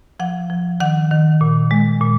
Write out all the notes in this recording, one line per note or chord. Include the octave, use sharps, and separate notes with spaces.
F3 F#5
F3
D#3 F#5
D#3
A#2
G#3
A#2